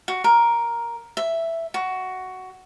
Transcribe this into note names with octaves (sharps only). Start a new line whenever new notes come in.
F#4
A#4
E5
F#4